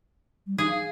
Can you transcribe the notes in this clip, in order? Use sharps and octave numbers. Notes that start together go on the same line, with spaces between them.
G3
D#4 G#4
F5